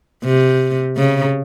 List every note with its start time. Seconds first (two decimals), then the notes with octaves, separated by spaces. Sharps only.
0.25 C3
0.97 C#3